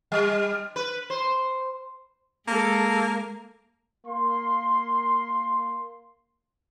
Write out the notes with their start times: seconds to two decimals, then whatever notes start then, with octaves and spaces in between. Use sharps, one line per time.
0.12 G3
0.76 B4
1.10 C5
2.48 G#3 A#3 G#4 A4
4.07 A#3 C6